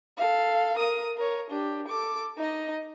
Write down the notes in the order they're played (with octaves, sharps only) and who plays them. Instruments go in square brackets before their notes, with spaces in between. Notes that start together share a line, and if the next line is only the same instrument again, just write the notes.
[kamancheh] A4 F5
A#4 D#6
A#4 C#5
D4 G4
A4 D6
D#4 D#5